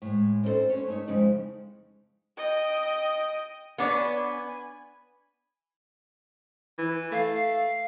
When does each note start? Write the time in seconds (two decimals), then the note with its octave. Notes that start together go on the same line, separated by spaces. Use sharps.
0.02 A2 G#3
0.43 C4 C#4 D#4 E4 A4 C5
0.70 C4 C#4 B4 C#5
0.87 A3 D#4 C#5
1.07 F2 C#3 G#3 D#4 E4
2.37 D#5 G5
3.78 B3 D4 C#5 G#5 B5
6.78 E3
7.12 A3 F5